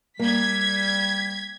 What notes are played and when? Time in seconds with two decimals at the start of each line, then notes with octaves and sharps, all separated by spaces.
0.19 G3 A#3 G#6 B6